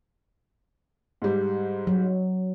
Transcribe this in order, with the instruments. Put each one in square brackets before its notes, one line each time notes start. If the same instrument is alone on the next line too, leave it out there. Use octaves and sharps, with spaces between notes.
[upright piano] G#2 G3
[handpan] F#3